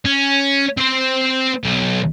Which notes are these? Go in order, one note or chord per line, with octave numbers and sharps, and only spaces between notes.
C#4
C4 C5
B1